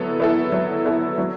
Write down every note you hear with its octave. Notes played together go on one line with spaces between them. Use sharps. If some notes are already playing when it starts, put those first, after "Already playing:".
Already playing: F#3 B3 E4 A4
B3 E4 A4
F#3
B3 E4 A4
F#3